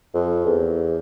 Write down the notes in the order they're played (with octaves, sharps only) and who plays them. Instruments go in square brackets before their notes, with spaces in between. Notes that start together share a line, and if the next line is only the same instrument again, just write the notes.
[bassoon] F2
E2